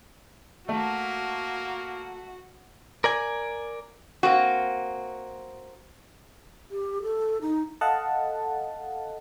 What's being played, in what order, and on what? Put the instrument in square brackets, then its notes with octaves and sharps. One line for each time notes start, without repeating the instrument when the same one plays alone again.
[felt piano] A3 [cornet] A#3 [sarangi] F#4
[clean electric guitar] A#4 D5 G#5
[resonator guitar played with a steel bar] A#3 C4 F#4
[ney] G4
A4
D#4
[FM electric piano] A4 D#5 F5 F#5 A5